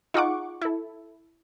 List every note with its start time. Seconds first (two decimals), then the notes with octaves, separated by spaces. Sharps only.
0.14 D#4 F4 G#4 F#5 C#6 D6
0.61 E4 A4